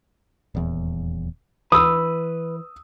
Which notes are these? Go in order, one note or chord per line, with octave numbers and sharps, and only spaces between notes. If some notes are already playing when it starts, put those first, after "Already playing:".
D#1 E2
E3 B4 D#6 E6